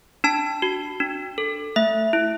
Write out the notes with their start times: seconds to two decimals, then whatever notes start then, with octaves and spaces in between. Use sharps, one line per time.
0.24 D4 A5
0.62 F#4
1.00 D4
1.38 A4
1.76 A3 E5
2.13 E4